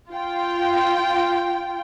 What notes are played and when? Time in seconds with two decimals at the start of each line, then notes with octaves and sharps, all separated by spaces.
0.11 F4 G5